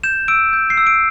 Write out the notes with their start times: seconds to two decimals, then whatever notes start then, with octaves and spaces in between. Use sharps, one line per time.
0.04 G6 E7
0.28 E6 D7
0.53 G6
0.70 C7
0.77 E6
0.87 D7